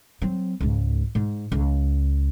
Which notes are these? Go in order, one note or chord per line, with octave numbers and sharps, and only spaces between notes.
F#3 C4
C#2 G#2
G#2
C#2